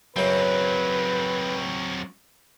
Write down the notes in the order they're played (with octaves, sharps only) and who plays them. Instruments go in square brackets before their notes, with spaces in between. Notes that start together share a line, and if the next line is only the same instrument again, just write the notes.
[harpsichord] F#2 C#3 [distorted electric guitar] F#3 C4 [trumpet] B4